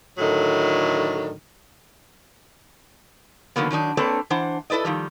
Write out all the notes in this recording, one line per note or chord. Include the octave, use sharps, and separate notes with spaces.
A2 D3 D#3 F#3
D3 D#3 F#3 A#3 B3
D#3 F#3 D4 D#4
A#3 C4 D4 A4 B4 C#5
E3 D4 C5 F#5
E4 A4 B4 D5 D#5
D#3 F3 G3